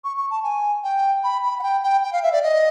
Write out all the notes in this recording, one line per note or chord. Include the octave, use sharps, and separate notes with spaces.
C#6
C#6
A5
G#5
G5
B5
B5
F#5
G5
G5
G5
F5
E5
D5
D#5